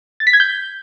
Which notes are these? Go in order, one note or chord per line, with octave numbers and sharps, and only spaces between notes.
A6
B6
G#6
G6